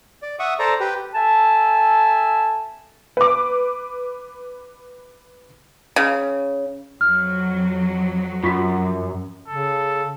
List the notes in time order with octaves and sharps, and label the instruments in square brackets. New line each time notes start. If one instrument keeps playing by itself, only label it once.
[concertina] D5
E5 F#5 C#6 D#6
A4 C5 D5 A#5
G4 B4
[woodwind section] A4 E5 G#5 A5
[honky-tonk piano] B4 D6
[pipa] C#3
[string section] F2 F#3 [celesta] F6
[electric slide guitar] F#2 [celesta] F4 C#6 B6
[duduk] C#3 [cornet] A4